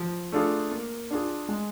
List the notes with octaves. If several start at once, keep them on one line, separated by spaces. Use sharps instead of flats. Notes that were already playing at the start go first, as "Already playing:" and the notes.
Already playing: F3
A3 D4 F4 G#4
A#3
D4 F4 G#4
G#3